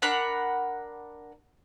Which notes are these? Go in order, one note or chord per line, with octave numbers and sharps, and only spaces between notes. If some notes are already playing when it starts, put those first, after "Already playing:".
D4 A#4 F#5 B5